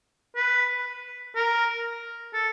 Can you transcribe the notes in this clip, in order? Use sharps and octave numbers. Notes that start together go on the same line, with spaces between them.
B4
A#4
A4